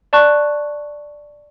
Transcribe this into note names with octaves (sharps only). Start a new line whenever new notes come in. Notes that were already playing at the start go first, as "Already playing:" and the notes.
D5 A5 C#6 F#6